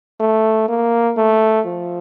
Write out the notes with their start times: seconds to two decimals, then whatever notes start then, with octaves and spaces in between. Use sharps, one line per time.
0.20 A3
0.68 A#3
1.17 A3
1.66 F3